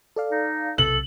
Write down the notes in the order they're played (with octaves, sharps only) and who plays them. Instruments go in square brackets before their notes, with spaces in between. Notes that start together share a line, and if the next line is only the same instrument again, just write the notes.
[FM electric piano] A4 D5 F5
[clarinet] D#4
[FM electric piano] B1 C3 [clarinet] A4 [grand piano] F#7